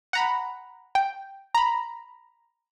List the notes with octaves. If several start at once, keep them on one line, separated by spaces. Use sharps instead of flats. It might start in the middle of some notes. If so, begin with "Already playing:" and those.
F#5 A#5 B5
G5
A#5 B5